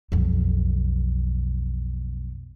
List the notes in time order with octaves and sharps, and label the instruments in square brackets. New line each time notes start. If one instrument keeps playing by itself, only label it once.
[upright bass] B1 F2